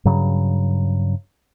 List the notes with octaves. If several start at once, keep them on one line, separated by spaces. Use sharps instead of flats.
G2 C#3 F#3